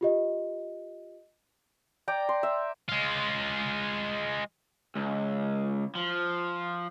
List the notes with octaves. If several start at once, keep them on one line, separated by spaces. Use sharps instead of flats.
F4 G4 D#5
D5 G5 A#5
C6
E5
G#3 F4
C#2
F3